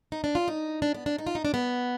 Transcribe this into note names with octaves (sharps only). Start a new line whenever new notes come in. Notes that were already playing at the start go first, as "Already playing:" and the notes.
D#4
D4
F4
D#4
D4
B3
D4
D#4
F4
D#4
D4
B3